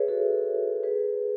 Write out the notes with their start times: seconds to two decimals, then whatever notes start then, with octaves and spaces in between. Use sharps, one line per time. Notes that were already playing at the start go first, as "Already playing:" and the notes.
Already playing: G#4 B4 C#5 E5
0.08 F#4 A4
0.83 G#4 B4